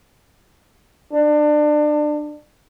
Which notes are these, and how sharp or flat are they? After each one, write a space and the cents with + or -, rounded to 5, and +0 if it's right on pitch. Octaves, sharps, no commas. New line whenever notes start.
D4 +25